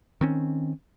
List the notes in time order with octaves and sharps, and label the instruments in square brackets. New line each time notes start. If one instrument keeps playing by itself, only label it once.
[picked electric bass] D#3 C4 C#4